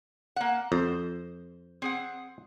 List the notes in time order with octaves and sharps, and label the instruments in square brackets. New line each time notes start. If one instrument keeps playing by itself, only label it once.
[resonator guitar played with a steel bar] A#3 F#5
[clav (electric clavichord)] F2 [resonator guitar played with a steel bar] C5
[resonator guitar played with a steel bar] C4 G#4 F#5